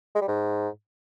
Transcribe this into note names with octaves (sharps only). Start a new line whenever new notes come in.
G#3
G3
G#2